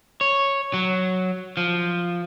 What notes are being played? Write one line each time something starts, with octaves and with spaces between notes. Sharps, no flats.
C#5
F#3
F3